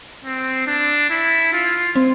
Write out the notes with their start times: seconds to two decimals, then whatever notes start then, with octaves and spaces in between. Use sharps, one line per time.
0.24 C4
0.67 D4
1.10 E4
1.53 F4
1.96 C4